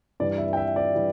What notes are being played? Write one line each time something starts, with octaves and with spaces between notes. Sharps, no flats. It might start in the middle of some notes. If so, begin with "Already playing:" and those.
G2 E3 G3 D5
E5
G5
E5
D5
E3 G3